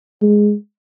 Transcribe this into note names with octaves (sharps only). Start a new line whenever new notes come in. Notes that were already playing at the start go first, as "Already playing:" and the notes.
G#3